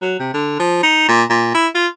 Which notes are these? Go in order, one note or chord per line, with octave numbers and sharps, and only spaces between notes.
F#3
C3
D3
F3
D#4
A#2
A#2
E4
F4